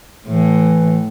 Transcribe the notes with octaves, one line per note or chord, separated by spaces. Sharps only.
A2 E3